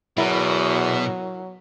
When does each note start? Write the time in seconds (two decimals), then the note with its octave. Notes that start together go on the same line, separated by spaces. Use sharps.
0.18 E2 B2 F#3 E4 A#4